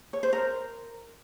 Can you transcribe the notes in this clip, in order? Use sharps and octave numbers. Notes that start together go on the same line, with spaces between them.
C#5
C5
A#4